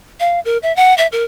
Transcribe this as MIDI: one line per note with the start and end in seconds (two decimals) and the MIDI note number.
0.20 0.40 77
0.45 0.58 70
0.63 0.74 76
0.76 0.96 78
0.98 1.07 76
1.12 1.24 70